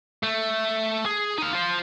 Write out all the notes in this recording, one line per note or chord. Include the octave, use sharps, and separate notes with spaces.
A3
G#4
D#4 F5
F4 C5